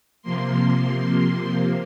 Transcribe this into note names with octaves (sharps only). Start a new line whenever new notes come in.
C3 F3 A#3 C6